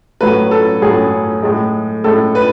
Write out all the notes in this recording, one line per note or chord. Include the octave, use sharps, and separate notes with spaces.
A2 F#3 A3 B4
A4
A2 F#3 A3 G#4
A2 G#3
A2 G#3 A4
B4